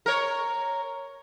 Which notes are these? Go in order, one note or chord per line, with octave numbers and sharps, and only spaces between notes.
A#4 C#5